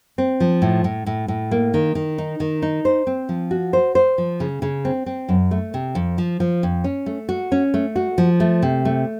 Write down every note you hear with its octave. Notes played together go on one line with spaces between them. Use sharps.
C4
F3
A2
A2
A2
A2
A#3
D#3
D#3
D#4
D#3
D#4
C5
C4
F3
F#4
C5
C5
F3
C#3
C#3
C4
C4
F#2
A3
C3
F2
F3
F3
F2
C#4
A3
F#4
C#4
A3
F#4
F3
A3
C3
A3